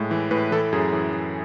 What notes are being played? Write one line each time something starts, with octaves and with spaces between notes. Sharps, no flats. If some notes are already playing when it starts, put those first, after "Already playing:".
Already playing: A2 G#3
E3
A2 B4
E3 A4
F#2 G#4
E3
E3